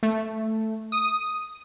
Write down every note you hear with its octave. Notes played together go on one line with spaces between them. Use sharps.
A3
D#6